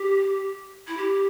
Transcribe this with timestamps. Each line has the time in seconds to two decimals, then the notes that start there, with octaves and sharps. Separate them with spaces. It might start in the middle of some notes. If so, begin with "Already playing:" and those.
Already playing: G4
0.87 E4
0.97 G4